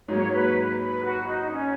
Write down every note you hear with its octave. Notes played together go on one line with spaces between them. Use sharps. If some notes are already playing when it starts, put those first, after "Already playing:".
G#2 F#3 A#3 C#5
B4
B4
F#4
D#4
C#4